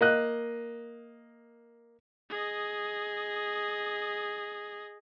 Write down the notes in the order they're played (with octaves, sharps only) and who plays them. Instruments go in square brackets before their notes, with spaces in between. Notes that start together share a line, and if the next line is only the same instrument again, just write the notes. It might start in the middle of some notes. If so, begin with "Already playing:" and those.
[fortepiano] A#3 D#5 F#6
[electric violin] G#4 D#5